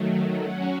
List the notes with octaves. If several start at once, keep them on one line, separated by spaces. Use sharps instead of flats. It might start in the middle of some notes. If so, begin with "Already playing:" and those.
Already playing: D#3 F#3 A3
F#3 C#4 F#4